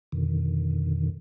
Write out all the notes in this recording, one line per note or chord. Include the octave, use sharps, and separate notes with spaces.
F2 B2 D3 D#3